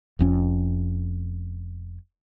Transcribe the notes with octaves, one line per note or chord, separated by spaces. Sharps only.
F1 F2 C#4